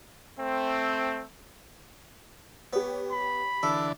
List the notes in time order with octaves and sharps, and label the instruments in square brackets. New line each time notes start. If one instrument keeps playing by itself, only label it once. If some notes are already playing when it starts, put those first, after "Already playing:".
[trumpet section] A3 C4
[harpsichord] B3 [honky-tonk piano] G4 C#5
[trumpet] B5
[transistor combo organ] D3 E3 D4 [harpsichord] A4